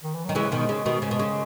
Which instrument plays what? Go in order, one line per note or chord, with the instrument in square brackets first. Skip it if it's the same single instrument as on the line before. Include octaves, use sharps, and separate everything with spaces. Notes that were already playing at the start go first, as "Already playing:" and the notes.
[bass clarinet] D#3
E3
[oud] D#3 [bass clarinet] F#3
[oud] C#3 E3 [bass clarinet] G#3
[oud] B2 D#3
C#3
B2 D#3
[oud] C#3 [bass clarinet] G#3
[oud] B2
C#3